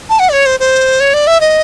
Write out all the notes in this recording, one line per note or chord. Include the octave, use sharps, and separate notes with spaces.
A5
F#5
D5
C#5
C5
C5
C#5
D5
E5
D#5